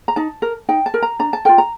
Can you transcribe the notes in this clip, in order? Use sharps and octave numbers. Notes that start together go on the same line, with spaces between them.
A#5
D#4 A5
A#4
D#4 G5
A5
A#4
A#5
D4 A#5
A5
F4 A#4 G5
A#5